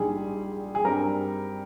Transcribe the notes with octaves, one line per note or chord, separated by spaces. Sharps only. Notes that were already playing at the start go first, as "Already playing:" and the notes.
Already playing: A#1 G#2 G3 G#4
G#4
G2 G3 C4 A#4